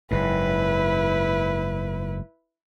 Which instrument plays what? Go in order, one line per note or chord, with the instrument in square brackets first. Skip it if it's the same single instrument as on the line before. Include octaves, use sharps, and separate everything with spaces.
[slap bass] F#1 G#2 [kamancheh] E4 B4